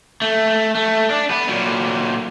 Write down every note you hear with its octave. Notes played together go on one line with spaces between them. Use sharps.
A3
A3
D4
B3
A#2 F#3